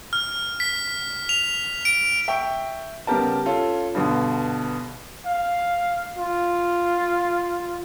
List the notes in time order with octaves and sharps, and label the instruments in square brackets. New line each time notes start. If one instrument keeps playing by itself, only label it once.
[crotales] F6
B6
F7
D7
[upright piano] E5 G5 C#6
C#3 G3 B3 G4 A#4 A5
C#4 F4 A4
G2 B2 D3
[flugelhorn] F5
F4